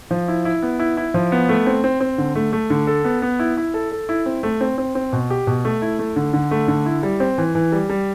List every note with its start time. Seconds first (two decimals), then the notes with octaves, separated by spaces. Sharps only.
0.11 F3
0.28 E4
0.45 E4
0.62 B3
0.79 E4
0.97 E4
1.14 F3
1.32 B3
1.49 A3
1.66 C4
1.84 C4
2.01 C4
2.18 D3
2.35 A3
2.53 A3
2.70 D3
2.87 A4
3.05 B3
3.22 B3
3.39 E4
3.57 E4
3.74 A4
3.92 A4
4.09 E4
4.26 C4
4.43 A3
4.61 C4
4.78 C4
4.95 C4
5.13 B2
5.30 G4
5.47 B2
5.65 A3
5.82 E4
5.99 A3
6.16 D3
6.33 D3
6.51 A3
6.68 D3
6.86 E4
7.03 G3
7.20 C4
7.38 E3
7.55 E3
7.72 G3
7.90 G3